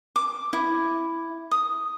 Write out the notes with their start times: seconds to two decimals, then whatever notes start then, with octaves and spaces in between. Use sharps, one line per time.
0.16 D6
0.53 E4
1.51 D#6